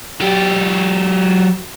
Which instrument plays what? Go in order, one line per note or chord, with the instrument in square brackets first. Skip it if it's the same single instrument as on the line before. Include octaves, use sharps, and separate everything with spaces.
[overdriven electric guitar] F#3 G4